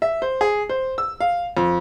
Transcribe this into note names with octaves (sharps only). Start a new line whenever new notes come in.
E5
C5
G#4
C5
E6
F5
F2